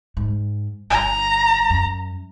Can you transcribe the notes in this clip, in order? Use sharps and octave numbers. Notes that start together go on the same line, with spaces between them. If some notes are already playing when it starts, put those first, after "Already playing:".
G#2
G1 A#5
F#2